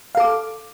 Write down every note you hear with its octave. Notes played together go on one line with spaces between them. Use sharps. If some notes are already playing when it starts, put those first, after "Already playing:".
A4 F5 D6